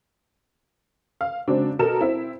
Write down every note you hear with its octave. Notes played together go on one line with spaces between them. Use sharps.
F5
C#3 F#3 G#3 C4 D4
B2 A4 A#4 E7
C4 E4